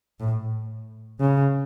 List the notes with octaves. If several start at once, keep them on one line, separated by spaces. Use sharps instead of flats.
A2
C#3